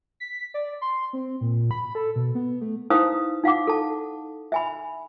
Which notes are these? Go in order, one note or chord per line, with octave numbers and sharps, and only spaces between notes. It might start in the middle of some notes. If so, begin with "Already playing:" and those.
B6
D5
C6
C4
A#2
B5
A4
B2
B3
A3
D#4 E4 B4 C5 F5 D#6
D#4 F5 F#5 D6
A4 A5
E5 G#5 B5